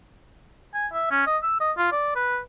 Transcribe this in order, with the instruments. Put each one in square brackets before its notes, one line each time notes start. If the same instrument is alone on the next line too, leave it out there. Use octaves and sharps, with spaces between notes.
[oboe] G#5
E5
C#4
D#5
E6
D#5
F4
D5
B4